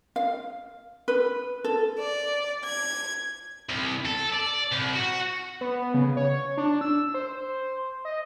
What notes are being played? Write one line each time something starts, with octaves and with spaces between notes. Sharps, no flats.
F5
B4
A4
D5
G#6
C2
A4
D5
C2
F#4
B3
C#3
C#5
D4
E6
C5
D#5